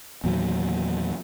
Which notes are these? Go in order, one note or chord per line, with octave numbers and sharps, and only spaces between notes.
E2 A#2 D#3 F#3